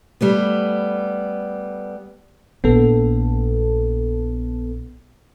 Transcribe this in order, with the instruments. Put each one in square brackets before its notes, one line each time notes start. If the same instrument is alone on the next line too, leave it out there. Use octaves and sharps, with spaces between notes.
[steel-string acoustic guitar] G3 A3 B3
[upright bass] A#1 [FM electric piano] B3 A4